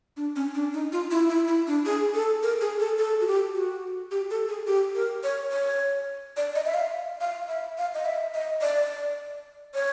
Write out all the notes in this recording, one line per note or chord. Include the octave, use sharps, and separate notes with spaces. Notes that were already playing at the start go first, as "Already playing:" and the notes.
D4
C#4
D4
D#4
F4
E4
E4
E4
D4
G#4
A4
A#4
G#4
A4
A4
F#4
G4
F#4
G4
A4
G#4
G4
A#4
C#5
C#5
D5
D#5
E5
F5
F5
E5
F5
D#5
E5
D#5
D5
C#5